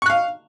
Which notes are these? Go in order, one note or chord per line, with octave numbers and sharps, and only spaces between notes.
F5 C#6 F#6